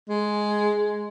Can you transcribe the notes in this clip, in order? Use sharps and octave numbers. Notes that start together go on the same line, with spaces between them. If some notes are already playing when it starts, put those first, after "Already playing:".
G#3